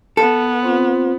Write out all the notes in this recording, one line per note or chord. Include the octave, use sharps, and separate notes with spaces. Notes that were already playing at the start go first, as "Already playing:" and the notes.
B3 A4
C4 F4 C5